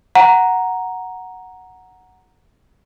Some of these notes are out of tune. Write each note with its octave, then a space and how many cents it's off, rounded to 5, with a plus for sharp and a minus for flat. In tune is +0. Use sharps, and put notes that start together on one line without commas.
F#5 +0 A#5 +0